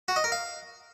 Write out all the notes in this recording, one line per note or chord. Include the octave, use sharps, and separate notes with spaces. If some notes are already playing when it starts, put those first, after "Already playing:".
F#4
D#5
A#4
F5